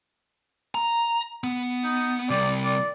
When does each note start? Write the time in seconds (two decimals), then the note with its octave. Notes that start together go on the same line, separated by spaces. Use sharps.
0.75 A#5
1.44 B3
1.84 D#4
2.30 C3 G3 D5
2.65 D5